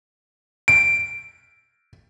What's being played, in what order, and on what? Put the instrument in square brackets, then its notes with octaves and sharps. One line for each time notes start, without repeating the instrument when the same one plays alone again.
[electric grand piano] D7